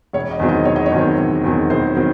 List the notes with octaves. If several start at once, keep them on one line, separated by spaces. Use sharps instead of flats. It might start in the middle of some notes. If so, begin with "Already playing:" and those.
E1 C#5
D#5
E2 D#3 F#3 C4
D#5
E1 C#5
D#5
C#5
E2 D#3 F#3 C4
E1
E2 D#3 F#3 C4
E1 C5
D#3 F#3 C4